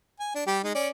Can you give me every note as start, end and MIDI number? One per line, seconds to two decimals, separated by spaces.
0.20 0.32 80
0.35 0.42 62
0.47 0.59 55
0.47 0.59 67
0.64 0.74 56
0.64 0.74 63
0.75 0.89 61
0.75 0.89 74